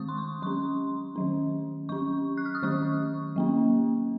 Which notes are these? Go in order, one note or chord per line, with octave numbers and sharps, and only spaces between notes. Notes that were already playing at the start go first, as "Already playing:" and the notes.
Already playing: D#3 G#3 C4 C#6 D#6
C6
C#6
F#3 C#4 C6
D#3 F#3 C#4
F#3 C#4 C#6
F#6
F6
D#6
D#3 F#3 C#4 C#6
F#3 A#3 C#4